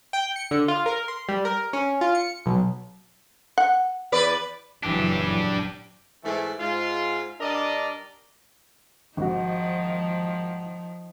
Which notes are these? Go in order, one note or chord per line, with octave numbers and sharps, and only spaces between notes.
G5
C#7
D3
F4
A#4
C6
G3
A#4
C#4
F4
C#7
B1
F#5
E2 B4 D5
F#1 A#2 E3 F#3 D4 G4
G#2 E3 A3
G#2 F4
G2 D4 A#4 D5 D#5
G#1 D#3 F3 F#4